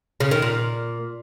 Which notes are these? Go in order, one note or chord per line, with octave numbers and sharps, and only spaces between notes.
C#3
D#3
A#2